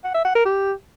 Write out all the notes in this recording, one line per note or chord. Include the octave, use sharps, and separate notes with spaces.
F#5
E5
F#5
A#4
G4